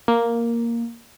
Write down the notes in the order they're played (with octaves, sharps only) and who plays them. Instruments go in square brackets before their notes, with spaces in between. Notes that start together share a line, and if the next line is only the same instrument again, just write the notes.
[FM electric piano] A#3